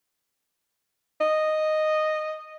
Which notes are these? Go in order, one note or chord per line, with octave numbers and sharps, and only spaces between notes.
D#5